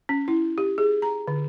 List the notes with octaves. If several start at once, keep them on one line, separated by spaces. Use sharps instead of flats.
C#4
E4
G4
G#4
A#5
D3